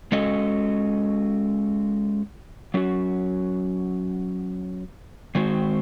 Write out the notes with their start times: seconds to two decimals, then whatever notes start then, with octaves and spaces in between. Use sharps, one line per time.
0.12 G#3 C#4 F#4 A4 D#5
2.74 F#3 C#4 F#4
5.35 D#3 G#3 C4 F#4